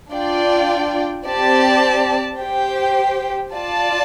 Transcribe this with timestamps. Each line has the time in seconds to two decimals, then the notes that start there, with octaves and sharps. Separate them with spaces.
0.12 D4 F4 D5 G5
1.26 C4 G4 D5 A5
2.40 G4 C5 G5
3.54 F4 D5 A5